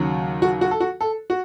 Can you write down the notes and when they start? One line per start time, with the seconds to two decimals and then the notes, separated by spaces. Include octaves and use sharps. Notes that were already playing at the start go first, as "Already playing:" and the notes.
Already playing: D#2 C#3 F#3
0.42 F#4
0.61 F#4
0.71 A4
0.80 F#4
1.01 A4
1.30 F#4